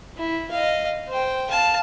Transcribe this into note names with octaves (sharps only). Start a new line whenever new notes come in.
E4
D#5 F5
C5 G5
F5 A5